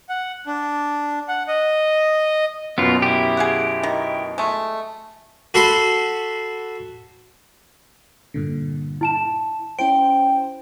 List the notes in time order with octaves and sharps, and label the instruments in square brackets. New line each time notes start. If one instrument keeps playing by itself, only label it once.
[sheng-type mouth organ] F#5
D4
F#5
D#5
[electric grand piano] F#2 B2 [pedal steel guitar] B3 F4
[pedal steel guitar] E4 G4
[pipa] G#4 F5 F#5
D#3
G#3 A3
[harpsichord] F#4 A4 B5 C6
[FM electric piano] G2 A#2 D3
[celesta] E4 A5 E7
[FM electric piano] C#4 E4 C5 [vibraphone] G5 [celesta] D7